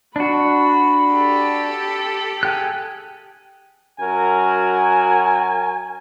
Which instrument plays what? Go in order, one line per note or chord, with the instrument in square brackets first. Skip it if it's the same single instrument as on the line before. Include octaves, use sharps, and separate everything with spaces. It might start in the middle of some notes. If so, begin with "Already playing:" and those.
[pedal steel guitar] D4 F#4 [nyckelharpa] B5
[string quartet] G4 A4
[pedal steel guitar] G#4 G5 F#6
[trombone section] F#2 F#4 A#4 [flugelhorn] G#5